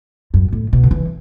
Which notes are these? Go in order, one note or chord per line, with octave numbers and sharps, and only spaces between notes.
F#2
A2
B2
D3
E3